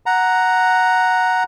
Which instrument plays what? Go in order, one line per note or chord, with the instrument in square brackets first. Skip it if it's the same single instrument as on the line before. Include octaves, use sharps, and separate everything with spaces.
[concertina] F#5 A#5